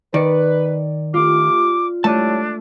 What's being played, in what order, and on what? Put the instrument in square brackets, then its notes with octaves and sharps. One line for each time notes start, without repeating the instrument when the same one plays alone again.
[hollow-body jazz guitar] D#3 [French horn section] B4 [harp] D5 C#7
[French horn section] A3 G4 [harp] F4 [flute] D6
[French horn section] G3 E4 C#5 [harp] A3 D#7 [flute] D4 [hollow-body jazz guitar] A5